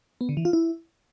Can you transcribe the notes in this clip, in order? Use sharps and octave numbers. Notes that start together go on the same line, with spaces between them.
B3
D3
E3
F4
E4